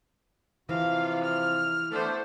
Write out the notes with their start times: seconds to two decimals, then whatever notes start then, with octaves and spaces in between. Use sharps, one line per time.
0.69 C3 E3 F3 F4 F5
1.24 F6
1.92 A3 B3 D4 A4 C5